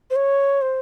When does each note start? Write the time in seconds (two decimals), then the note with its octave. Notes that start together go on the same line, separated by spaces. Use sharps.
0.11 C5
0.16 C#5
0.62 C5